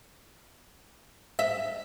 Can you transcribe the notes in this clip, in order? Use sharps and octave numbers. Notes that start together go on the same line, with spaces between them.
E5